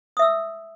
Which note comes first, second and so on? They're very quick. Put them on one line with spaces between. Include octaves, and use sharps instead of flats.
D#6 E5 E6